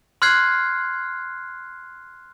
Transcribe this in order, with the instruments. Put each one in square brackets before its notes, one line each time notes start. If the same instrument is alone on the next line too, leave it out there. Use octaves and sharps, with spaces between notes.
[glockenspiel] C6 F6 F#6 G#6 C7